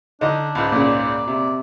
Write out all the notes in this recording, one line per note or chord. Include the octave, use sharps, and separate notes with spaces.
D3 D4 D#4 D#5
C#2 G#2
A#2 C#3 D5
C3